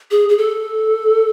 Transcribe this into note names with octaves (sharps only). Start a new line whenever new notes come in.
G#4
G#4
A4